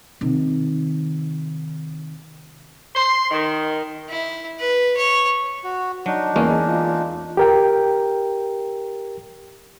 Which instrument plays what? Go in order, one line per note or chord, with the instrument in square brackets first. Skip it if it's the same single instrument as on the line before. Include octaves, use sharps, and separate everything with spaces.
[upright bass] C3 D#3
[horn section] C6
D#3
[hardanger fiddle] E4
B4
C#5
[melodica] F#4
[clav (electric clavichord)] F#3 [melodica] D4 D#4
[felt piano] E2 [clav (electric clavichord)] G#3 A#3 C#4
[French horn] F4
[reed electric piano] G4 A#4 G5